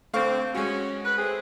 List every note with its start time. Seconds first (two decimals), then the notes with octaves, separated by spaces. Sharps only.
0.13 D3 A3 C4 F5 C#6
0.55 G#3 C#4 F#4
1.04 B4
1.17 A3 C4 G#4